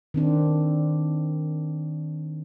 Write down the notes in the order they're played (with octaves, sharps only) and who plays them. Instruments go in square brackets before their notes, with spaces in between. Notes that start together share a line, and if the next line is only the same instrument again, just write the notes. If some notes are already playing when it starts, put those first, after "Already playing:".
[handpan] D#3 C4 D4